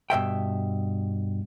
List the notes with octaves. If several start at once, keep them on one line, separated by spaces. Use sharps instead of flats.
G2 B2 E5 G5